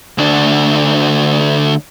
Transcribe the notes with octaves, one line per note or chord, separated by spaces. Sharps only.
D2 D4